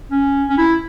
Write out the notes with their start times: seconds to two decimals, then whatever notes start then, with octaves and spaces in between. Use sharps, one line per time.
0.10 C#4
0.49 C#4
0.58 E4